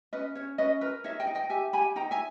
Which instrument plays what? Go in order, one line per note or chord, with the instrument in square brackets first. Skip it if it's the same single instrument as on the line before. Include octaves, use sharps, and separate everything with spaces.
[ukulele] C#4 B4 D#5
C#4 C#5
C#4 B4 D#5
A#4 B4 D#5
D#4 C#5 E5
D#5 G5
D#4
D#5 G5
G4 E5 G#5
G4 G#5 B5
D#4 G5 A#5
E5 G#5